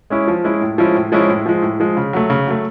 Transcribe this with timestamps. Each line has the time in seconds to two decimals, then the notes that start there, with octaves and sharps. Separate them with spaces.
0.10 G#3 C#4 E4
0.28 F3
0.44 G#3 C#4 E4
0.61 A2
0.78 F3 G#3 C#4 E4
0.95 A2
1.12 F3 G#3 C#4 E4
1.29 A2
1.46 F3 G#3
1.62 A2
1.80 F3 G#3
1.97 C#3
2.13 F#3 A3
2.30 C#3
2.47 F#3 A3